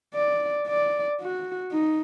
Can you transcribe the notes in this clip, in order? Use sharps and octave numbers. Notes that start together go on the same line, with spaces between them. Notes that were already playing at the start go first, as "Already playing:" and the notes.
D5
D5
F#4
D#4